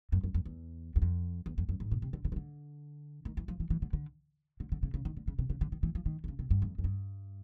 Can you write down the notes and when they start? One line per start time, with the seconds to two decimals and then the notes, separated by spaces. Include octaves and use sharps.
0.12 F#2
0.23 F#2
0.34 F2
0.45 E2
0.96 E2
1.02 F2
1.46 E2
1.58 F2
1.69 F#2
1.80 G#2
1.92 B2
2.02 C3
2.13 D3
2.25 C#3
2.32 D#3
2.36 D3
3.25 D#3
3.37 E3
3.48 F3
3.60 E3
3.70 E3
3.82 D3
3.93 D3
4.60 D3
4.72 D3
4.83 C#3
4.94 C#3
5.05 D#3
5.17 D3
5.28 C#3
5.39 C3
5.50 C#3
5.61 D3
5.72 D#3
5.83 E3
5.95 F3
6.06 D#3
6.24 C3
6.28 C#3
6.39 C3
6.51 G2
6.62 F2
6.78 F#2
6.84 G2